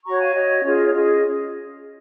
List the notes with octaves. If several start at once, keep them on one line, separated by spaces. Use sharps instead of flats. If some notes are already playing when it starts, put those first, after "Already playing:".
F#4 C#5 A#5 C#6
F5 G#5
F#4 C#5 D#5
C#4 F4 G#4 C#5
D#5
C#5
C#4 F4 G#4 D#5